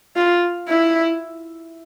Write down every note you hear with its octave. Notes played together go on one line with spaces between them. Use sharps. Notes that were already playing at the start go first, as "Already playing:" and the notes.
F4
E4